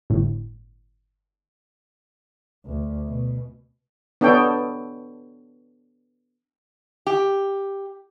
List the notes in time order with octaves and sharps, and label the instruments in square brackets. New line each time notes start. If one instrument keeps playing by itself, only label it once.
[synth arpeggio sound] G1 A2
[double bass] D2
B2
[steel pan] B3 D4 A4 C#5 G5
[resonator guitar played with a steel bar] G4